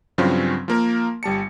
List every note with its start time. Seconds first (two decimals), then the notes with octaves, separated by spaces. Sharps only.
0.18 G2 C#3 F3 F#3 C4 C#4
0.68 F3 A#3 A#4
1.23 G1 G3 A5 C#7